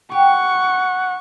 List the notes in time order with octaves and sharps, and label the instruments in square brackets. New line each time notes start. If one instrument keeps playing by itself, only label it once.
[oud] G4 [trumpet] F#5 [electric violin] C#6